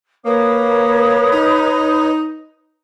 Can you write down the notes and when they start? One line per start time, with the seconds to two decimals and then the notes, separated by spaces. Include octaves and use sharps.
0.25 A#3 B4 C#5 D#6
1.32 D#4